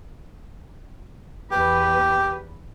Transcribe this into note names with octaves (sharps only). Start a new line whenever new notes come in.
E2 G4 B4